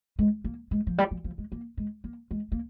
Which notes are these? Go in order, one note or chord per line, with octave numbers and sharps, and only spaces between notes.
G#3
A#3
G#3
F3
G3
F3
F3
G#3
A#3
G#3
A#3
G#3
A#3